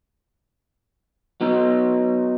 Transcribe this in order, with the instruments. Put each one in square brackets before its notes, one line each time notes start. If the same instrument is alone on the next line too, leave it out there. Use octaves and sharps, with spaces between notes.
[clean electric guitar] F#3 B3 D#4